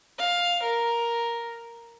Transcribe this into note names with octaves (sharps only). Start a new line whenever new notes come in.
F5
A#4